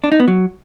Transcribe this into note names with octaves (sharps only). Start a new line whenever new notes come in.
D4
D#4
B3
F#3